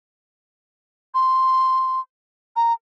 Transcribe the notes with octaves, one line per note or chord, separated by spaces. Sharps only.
C6
A#5